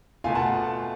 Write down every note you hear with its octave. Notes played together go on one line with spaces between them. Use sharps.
B2 A3 F4 F5 G#5
F#5 A5